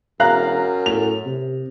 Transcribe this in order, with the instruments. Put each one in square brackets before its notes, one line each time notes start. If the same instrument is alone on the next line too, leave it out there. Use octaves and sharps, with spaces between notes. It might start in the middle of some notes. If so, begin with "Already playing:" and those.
[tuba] E1 [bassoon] F#2 [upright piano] F5 A#5 F#6
[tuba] A2 [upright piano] F7
[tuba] C3